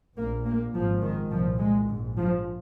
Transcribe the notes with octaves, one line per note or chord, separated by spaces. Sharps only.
A#1 A#2 A#3
A#3
G#1 G#2 F3
D#3
C2 A#2 F3
G#3
A#1 G#2 D#3
F3